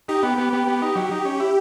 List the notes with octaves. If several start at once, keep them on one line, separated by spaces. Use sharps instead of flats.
D#4 G4
B3
B3
B3
B3
D#4
F#3
D#4
C#4
E4